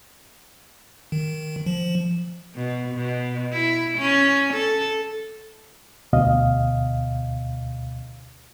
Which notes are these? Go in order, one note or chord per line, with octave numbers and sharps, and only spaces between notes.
D#3
F3
B2
B2
E4
C#4
A4
D2 B2 D#5 F5